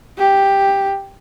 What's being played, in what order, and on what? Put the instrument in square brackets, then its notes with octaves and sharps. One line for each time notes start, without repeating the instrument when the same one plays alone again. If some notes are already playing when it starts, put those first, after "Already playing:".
[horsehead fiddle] G4